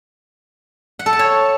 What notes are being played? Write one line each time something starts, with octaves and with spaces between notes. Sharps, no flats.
F#5
A4
A5
C#5